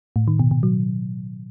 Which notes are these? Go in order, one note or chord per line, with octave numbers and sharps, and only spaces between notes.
A2
D#3
B2
B2
F#3